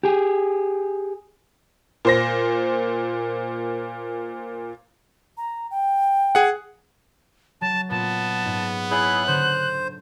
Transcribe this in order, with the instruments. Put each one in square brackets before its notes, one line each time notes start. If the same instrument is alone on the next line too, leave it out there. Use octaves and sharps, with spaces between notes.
[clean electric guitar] G4 G#4
[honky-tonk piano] A#2 C5 A#6
[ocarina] A#5
G5
[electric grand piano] G#4 F#5
[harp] F#3 [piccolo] A5
[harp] A#2 [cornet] B3 [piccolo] A5
[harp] G#2
[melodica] E4 G#4 [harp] C#5 D5 [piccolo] F#6
[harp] D3 [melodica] C5